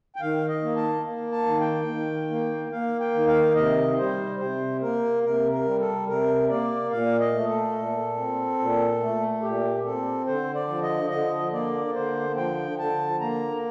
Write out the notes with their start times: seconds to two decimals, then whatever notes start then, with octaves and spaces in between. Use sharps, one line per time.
0.16 G5
0.21 D#3 F5
0.48 D#5
0.63 A#3
0.76 A5
1.04 A#3
1.32 A5
1.46 D#3
1.60 G5
1.88 D#3
2.30 A#3
2.72 A#3 F5
3.00 G5
3.14 D#3
3.27 F5
3.56 C3 D#5
3.98 G3 C5
4.39 C3 C5
4.82 A#3 A#4
5.23 C3 A#4
5.52 A#4
5.65 G3
5.79 A4
6.08 C3 A#4
6.49 A#3 D5
6.91 A#2 F5
7.20 D#5
7.33 A3
7.48 A4
7.75 A#2
8.17 C4
8.59 A#2
9.00 A3
9.42 A#2 G4
9.85 C4 A4
10.27 D3 C5
10.55 D5
10.68 F3
10.83 D#5
11.10 D3 D#5
11.53 A#3 D5
11.94 D3 C5
12.36 F3 G5
12.78 D3 A5
13.20 A#3 A#5